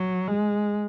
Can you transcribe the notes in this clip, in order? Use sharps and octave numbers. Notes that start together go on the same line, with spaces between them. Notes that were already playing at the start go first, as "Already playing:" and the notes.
Already playing: F#3
G#3